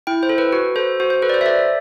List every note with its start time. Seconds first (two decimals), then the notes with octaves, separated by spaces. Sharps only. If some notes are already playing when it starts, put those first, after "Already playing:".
0.07 E4 G5
0.23 C5
0.29 A4
0.38 B4
0.53 F#4 B4
0.76 A4 C5
1.00 F#4 C5
1.10 C5
1.22 A4 B4
1.29 D5
1.34 C5
1.41 E5
1.46 A4 D5